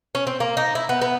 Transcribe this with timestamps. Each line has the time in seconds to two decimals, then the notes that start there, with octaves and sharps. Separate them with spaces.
0.15 C#4
0.27 C4
0.40 A#3
0.57 D#4
0.75 E4
0.89 B3
1.02 B3